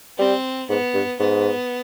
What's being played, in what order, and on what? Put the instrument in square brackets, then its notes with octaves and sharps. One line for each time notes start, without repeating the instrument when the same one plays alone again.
[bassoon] G3 [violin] C4
[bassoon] G#2 [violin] B3
[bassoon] G2
[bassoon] G#2 [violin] B3